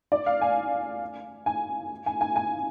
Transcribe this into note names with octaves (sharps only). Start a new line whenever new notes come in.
D5
F5
G#5
G#5
G#5
G#5
G#5